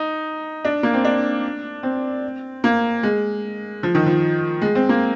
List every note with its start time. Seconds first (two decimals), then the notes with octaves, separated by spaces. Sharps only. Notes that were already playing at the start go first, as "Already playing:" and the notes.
Already playing: D#4
0.65 D4
0.83 A#3
0.94 C4
1.05 D4
1.83 C4
2.64 A#3
3.03 G#3
3.83 F3
3.95 D#3
4.06 F3
4.62 G#3
4.75 C4
4.89 A#3